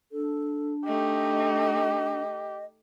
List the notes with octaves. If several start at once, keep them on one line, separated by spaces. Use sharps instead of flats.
D4 A4
A3 D#4 G4 D#5